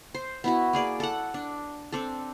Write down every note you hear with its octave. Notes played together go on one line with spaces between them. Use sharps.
C5
B3 E4 F#4
A#3 G#4 D5
A4 F#5
D4
C4 D4 A4